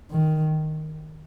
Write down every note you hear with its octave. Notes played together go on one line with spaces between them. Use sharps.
D#3